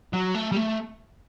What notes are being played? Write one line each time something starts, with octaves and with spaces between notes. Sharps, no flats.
F#3
A3
G3
A3